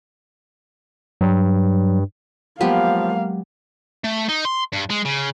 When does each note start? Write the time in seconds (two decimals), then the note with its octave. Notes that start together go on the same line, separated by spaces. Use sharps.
1.21 G2 F#3
2.61 F3 F#3 G#3 A#3 B3 G4 F5
4.04 A3
4.29 D#4
4.45 C6
4.73 G2
4.90 G#3
5.05 C#3